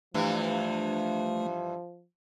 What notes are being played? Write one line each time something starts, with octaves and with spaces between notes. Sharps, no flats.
G2 E3 F3 A3